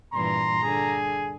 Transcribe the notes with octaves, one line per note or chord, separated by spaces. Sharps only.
G2 A#2 E3 A#5 C6
D3 G#4